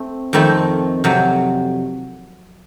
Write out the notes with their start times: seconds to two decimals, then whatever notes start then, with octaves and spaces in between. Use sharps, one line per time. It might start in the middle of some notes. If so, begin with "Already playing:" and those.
Already playing: A3 C4
0.33 F2 D#3 A3 C4
1.04 F2 C3 F#3